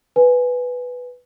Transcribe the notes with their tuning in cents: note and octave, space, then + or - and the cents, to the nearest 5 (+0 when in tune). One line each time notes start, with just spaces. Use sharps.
B4 +0 G#5 +0